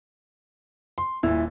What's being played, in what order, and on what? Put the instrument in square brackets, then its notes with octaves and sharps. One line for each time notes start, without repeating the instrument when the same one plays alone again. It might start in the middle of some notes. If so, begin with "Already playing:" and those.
[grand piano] C6
[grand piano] D#1 A#2 [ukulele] E4